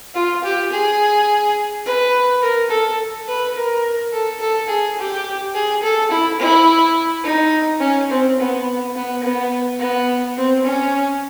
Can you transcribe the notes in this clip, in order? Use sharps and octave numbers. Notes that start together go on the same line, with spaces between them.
F4
G4
G#4
B4
A#4
A4
B4
A#4
A4
A4
G#4
G4
G#4
A4
E4
E4
D#4
C#4
C4
B3
B3
B3
B3
C4
C#4